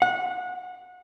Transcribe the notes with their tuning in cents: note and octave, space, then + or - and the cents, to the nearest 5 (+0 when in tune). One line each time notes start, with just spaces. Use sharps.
F#5 -25